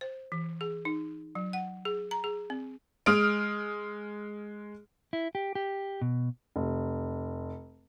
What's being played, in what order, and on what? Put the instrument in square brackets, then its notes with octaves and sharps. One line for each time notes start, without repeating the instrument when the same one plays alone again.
[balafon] C5
E3
G#4
D#4
F#3
F#5
G#4
A#5
G#4
C4
[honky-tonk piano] G#3 D#6 F6 D7
[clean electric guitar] E4
G4
G4
B2
[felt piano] F1